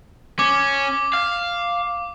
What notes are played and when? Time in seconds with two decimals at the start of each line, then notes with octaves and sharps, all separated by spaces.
0.39 C#4 D6
1.13 F5